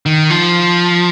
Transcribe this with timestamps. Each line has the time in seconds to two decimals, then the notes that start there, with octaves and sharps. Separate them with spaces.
0.06 D#3
0.30 F3